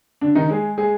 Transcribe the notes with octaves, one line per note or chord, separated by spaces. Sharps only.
D3 D4
D#3 D#4
G#3 G#4
G#3 G#4